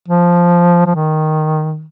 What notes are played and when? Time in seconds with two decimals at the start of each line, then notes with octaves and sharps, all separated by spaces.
0.08 F3
0.86 F3
0.95 D#3